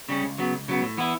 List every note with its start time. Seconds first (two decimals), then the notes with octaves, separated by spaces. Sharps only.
0.09 C#3 G3 C#4
0.23 C#2
0.38 C#3 F#3 B3
0.52 C#2
0.68 C#3 F#3 B3
0.82 A2
0.97 E3 B3 E4